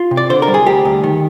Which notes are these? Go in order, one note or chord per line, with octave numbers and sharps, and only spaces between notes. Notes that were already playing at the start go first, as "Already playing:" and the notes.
Already playing: F4
C3
D5
D3 C5
A#4
G3
G#4
D2 G4
D2
D#3